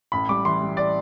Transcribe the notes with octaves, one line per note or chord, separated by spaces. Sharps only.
A1 B5
G3 D6
E3 C6
G3
D5